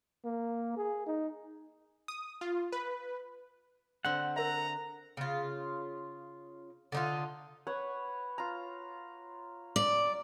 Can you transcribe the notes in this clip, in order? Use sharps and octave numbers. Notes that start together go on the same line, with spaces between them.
A#3
G#4
D#4
D#6
F4
B4
D3 C4 F#5
A#4 E5 A#5
C#3 F4
D3 D#4 F4
B4 C#5 F#5
F4 A#5
D5